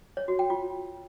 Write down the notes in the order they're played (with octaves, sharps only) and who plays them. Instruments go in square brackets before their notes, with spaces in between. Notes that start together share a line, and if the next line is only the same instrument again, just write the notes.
[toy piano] C#5
F#4
G5
F4